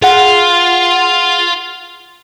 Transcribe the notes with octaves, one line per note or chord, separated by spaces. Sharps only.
F4 G#4 F#5